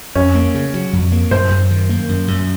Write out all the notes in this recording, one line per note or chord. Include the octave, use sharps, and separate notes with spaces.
F2 C#4
A#3
C#3
F#3
F2
A#3
F#2 C5
F#2
D#3
A#3
F#2
F#2